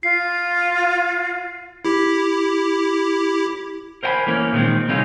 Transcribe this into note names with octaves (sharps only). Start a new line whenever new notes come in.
F4 C7
E4 G4
A#4 C5 D#5 G5 G#5 B5
E3 A3 A#3 C#4
A#2 D#3 G#3 C4
C3 G3 A3 C#4 D#4 F4